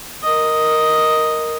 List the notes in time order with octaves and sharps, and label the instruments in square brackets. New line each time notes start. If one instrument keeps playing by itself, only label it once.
[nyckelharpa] A#4 D#5